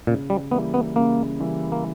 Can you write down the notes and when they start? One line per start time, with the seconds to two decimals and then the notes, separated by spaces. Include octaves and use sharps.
0.07 A#2 C#3
0.30 G3
0.51 E3 G3 A#3 B3 E4
0.74 B3
0.96 C#3 A#3
1.40 E3 G3 A#3 E4
1.72 A#3